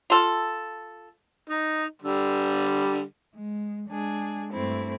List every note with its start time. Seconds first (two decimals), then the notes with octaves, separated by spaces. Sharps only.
0.10 F4 A4
1.50 D#4
2.02 D3 G3
3.35 G#3
3.89 G#3 D4 G#4
4.51 G2 A3 C4 E4